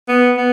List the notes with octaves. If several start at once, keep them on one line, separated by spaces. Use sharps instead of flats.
B3
B3